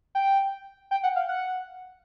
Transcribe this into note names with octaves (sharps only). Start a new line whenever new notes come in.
G5
G5
F#5
F5
F#5